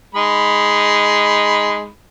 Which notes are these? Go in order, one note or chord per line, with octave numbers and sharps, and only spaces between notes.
G#3 D#4 B5